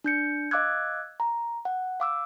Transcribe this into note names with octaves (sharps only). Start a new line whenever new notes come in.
D4 G6 C#7
D#5 F5 D6 E6 F#6 G#6
A#5
F#5
F5 D6 E6